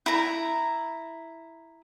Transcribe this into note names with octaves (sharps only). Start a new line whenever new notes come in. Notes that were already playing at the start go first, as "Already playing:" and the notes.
E4 A#5